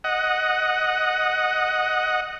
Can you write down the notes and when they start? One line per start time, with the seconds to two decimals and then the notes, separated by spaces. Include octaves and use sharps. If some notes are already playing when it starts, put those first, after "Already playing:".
0.04 D#5 F#5